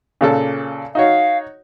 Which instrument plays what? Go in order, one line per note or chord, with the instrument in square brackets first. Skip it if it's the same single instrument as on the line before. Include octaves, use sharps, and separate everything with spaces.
[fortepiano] A#2 C#3 A4
[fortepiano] D#4 F#4 C#5 [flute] F5